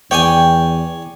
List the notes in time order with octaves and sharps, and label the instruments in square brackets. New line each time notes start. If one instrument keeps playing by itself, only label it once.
[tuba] E2 [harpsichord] C#5 D5 G#5 [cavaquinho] G5